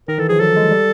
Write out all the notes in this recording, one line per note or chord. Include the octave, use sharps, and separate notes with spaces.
D#3 A#4
E3 A4
F3 G#4
F#3 A4
G#3
G3